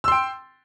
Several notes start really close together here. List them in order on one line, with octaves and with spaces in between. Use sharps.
E6 C6 G5